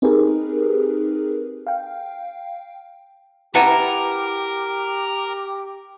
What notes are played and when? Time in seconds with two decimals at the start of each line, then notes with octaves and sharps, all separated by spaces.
0.02 C4 D#4 G4 G#4 A#4 B4
1.67 F5 G5
3.55 E4 G4 A#4 B4 F#5 A5 A#5 D#7